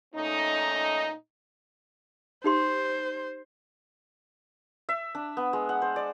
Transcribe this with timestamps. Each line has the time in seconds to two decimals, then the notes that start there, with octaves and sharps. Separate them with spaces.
0.15 A#2 A3 C#4 D#4
2.44 D#4 G4 C5 C6
4.89 E5
5.15 D4
5.37 B3
5.53 G#3
5.69 F#5
5.82 C5
5.96 D5